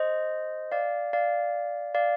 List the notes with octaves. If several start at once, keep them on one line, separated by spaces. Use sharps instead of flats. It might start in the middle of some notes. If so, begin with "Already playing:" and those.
Already playing: C5 D#5
D5 F5
D5 F5
D5 F5